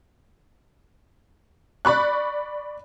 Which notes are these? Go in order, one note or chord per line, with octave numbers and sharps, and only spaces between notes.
D5 B5 C#6 F#6